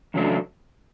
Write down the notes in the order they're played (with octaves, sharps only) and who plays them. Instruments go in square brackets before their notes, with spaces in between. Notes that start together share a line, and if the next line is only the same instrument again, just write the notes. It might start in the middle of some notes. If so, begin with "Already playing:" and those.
[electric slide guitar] E2 C#3 F#3 A3 D4